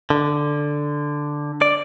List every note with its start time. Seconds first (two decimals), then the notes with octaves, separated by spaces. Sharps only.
0.10 D3
1.62 D5